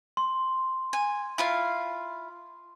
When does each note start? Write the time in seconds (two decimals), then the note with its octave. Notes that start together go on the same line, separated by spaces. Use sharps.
0.17 C6
0.93 G#5
1.38 E4 F4 F5